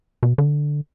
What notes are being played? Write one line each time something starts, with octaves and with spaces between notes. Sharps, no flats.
B2
D3